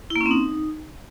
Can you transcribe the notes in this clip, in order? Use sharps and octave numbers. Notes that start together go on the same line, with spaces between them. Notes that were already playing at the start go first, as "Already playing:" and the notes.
E4
A#3
C#4
C4
D#4